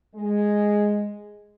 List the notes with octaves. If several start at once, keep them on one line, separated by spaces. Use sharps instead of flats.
G#3